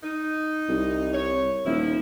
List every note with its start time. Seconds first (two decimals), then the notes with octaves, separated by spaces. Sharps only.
0.03 D#4
0.69 C2
1.13 C#5
1.66 D#1 F3 E4